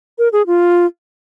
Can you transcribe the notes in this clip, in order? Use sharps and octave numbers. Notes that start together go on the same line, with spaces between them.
A#4
G#4
F4